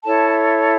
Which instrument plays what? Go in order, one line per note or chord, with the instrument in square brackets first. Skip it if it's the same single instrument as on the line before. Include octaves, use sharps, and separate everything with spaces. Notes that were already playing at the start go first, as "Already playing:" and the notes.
[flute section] E4 A4 C#5 A5